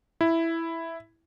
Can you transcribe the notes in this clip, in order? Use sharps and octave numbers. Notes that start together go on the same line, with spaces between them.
E4